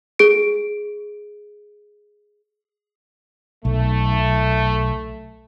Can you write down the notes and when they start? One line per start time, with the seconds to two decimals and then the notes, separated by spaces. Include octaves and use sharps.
0.19 G#4 D7
3.65 B1 A3